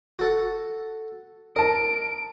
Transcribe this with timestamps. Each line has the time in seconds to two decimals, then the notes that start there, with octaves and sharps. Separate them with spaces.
0.19 F#4 A4 F#5
1.56 A#4 D#5 A5 D7